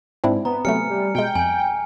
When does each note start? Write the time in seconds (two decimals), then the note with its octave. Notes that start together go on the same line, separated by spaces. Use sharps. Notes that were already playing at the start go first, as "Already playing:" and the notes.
0.24 G#2 C4 D4 E4
0.45 B3 A#5
0.65 C3 F#3 A3 G#5 F6 C#7
0.90 G3
1.15 B2 G#3 G5
1.36 F2 G#5